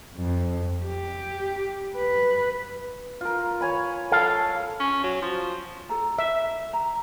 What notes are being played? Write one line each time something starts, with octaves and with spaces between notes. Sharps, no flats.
F2
G4
B4
F4 A#4
C#5 G#5 B5
A4 F5
C#4
F#3
F3
A4 A#5
E5
A#5